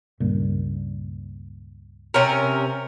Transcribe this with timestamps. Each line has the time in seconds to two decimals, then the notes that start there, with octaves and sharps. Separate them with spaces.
0.20 C#2 G2 A#2
2.14 C3 C#4 A#4